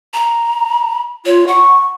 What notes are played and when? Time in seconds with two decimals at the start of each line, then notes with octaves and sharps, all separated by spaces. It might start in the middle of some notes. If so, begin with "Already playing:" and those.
0.14 A#5
1.26 F4 C#5
1.48 F#5 C#6